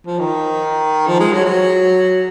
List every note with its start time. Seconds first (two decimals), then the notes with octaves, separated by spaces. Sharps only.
0.07 F3
0.19 D#3
1.08 F3
1.20 G#3
1.33 F#3
1.45 F#3